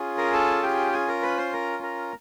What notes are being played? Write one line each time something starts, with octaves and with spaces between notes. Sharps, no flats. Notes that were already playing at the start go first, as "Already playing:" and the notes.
Already playing: C#4 F4 G#4
A#4 A#5
A4 A5
G4 G5
G#4 G#5
A#4 A#5
B4 B5
C5 C6
A#4 A#5
A#4 A#5